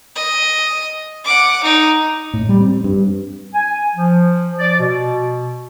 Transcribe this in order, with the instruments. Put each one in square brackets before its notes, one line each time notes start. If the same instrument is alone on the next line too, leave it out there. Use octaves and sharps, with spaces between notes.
[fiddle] D#5
F#5 D6
D#4
[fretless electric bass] A2
G3
C4
G2
[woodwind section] G#5
F3
D5
B2